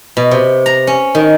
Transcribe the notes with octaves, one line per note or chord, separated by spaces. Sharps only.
B2
C3
A#5
C#4
D#3